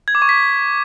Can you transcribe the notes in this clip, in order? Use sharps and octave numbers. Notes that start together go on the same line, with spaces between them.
G#6
D6
C#6
B6